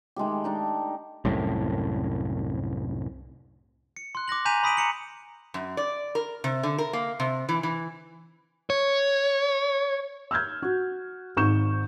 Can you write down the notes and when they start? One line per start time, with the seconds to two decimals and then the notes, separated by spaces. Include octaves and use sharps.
0.16 D#3 G#3 A3 G4
0.44 D4 D#4 G4
1.25 C2 F#2 A2
3.96 C#7
4.15 C6 F#6
4.28 D6 F#6 A#6 F#7
4.45 G#5 A#5 G6 B6 D#7 F7
4.63 B5 D#6 B6 D7 D#7 F#7
4.77 A#5 C#7 F#7
5.54 F#2
5.77 D5
6.15 A#4
6.44 C3
6.63 D3
6.78 A#4
6.93 A#3
7.20 C3
7.49 E3
7.63 E3
8.70 C#5
10.31 E6 F6 G6 G#6
10.62 F#4
11.37 G#1 G#2 C#6 G6 E7